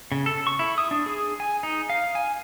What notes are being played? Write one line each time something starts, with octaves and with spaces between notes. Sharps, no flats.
C#3
A4
C#6
E4
D#6
D4
G#4
G#5
D#4
F5
G#5